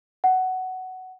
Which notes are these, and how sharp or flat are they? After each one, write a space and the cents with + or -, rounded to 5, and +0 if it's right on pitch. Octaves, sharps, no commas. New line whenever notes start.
F#5 +10